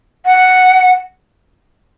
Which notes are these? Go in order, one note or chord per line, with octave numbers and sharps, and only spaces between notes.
F#5